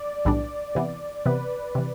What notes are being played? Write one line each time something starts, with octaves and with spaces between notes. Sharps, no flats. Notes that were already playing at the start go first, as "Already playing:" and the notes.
Already playing: D5
B1 A2 E3 G3 D4
C3 E3 B3
C3 E3 B3 B4
C3 E3